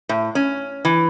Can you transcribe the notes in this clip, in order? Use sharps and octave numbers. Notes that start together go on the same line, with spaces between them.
A2
C#4
E3